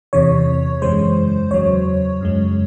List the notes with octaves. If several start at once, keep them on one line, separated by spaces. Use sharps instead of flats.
E2 C3 E3 C#5
F#2 C#3 E3 G#3 C5
E2 C#3 F#3 C#5
F#2 C#3 G#3